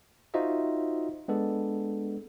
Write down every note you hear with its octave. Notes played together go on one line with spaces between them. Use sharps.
D#4 F4 F#4 C5 D#5 E5
G#3 B3 D4 A4